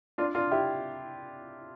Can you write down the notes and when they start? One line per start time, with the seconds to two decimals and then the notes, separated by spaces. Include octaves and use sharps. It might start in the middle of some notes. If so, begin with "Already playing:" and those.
0.18 D4 F4
0.35 D4 F4
0.51 E4 G4